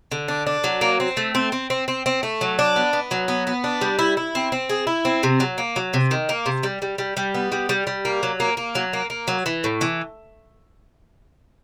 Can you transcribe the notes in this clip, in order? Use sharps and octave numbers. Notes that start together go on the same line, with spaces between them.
D3
D4
D4
F#3
A#3
C4
A3
C4
C4
C4
C4
C4
A3
F#3
D4
B3
B3
F#3
B3
B3
D4
G3
E4
E4
C4
C4
G#4
E4
C4
C3
F#3
A#3
F#3
C3
D#3
A#3
C3
G3
G3
G3
G3
B3
G3
G3
G3
A#3
F#3
A#3
A#3
F#3
A#3
A#3
F#3
E3
A2
E3